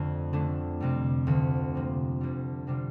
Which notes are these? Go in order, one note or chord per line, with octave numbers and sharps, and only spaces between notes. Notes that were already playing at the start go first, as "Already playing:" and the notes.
Already playing: F2 D3 A3
D3 A3 D4
F2 C3 G3
D2 D3 F3
C3 F3 A#3
D2 D3 G3
C3 G3 D4 F4